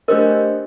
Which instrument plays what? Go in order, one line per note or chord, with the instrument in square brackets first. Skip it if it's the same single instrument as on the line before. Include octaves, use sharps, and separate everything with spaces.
[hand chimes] A3 D4 G4 C5 D#5 [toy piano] A#4